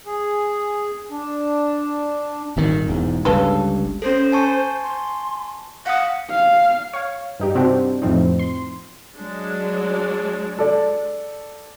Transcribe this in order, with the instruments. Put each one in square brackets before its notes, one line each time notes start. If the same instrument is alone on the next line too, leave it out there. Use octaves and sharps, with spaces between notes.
[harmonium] G#4
D4
[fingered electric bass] D#1 G#1 D#3
E1 E2 G#2
[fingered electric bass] G1 C#2 G2 [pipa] C#3 A4 B4
[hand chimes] C#4 A4 [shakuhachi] C5
[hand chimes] G#5 A5 C#6
[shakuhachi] C6
[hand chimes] F5 D#6 [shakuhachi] F#5
[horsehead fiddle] F5
[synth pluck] C#5 F5
G2 D#4 G4
C3 C4 D4 F#4 G4
F2 A2 F3 C4 D#4
C6
[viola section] F#3 G#3 D4
[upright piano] A4 D5